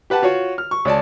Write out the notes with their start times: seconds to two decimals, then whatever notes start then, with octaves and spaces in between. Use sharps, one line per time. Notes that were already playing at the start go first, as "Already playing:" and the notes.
0.10 G4 B4 F#5 A5
0.22 F4 F#4 C#5
0.58 F6
0.71 C#6
0.85 C#2 C#5 D5 A5